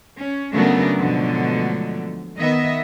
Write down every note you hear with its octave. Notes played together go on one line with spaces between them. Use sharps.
C#4
C#3 F#3 A3 B3 D4 A#4
G#2 B2 D3 F3 F#3 A3
D#3 B3 D#5 E5